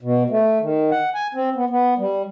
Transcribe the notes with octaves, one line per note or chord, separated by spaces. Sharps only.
B2
A3
D#3
F#5
G#5
C4
B3
B3
G3